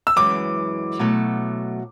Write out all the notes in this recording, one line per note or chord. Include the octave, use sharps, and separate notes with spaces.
E6
F#2 E3 G#3 D6
B2 F#3 A3